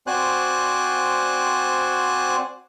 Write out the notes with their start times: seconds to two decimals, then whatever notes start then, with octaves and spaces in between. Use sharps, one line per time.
0.07 C4 F#4 C5 D5 G#5 F#6